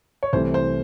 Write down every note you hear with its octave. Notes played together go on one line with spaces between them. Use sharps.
C#5
C2 C3 E3 A3 C5
C5